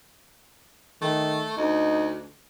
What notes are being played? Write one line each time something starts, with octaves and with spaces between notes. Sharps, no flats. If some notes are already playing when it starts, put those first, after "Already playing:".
D#3 A3
D2 D#4